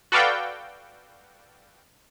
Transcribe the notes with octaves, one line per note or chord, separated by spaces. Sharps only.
F#4 A4 B4 D5 F5 G5